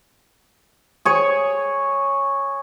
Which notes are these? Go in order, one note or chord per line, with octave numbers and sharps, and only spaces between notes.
G#4 C#5